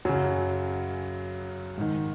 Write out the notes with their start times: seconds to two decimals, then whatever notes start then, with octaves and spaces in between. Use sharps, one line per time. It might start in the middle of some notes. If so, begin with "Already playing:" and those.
0.05 F#2 C#3 F#3
1.77 G#2 D#3